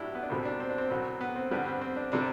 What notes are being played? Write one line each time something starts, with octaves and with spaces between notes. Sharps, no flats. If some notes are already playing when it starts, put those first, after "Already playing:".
Already playing: A2 F#3 D4 E4 G4
B3
D4
C2 B2 G3 C4
D4
C4
D4
C4
C2 B2 F#3
B3
C4
G2 D3 G3 B3
C4
C4
D4
C3 G3 D4